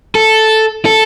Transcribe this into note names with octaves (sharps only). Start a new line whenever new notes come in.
A4
A4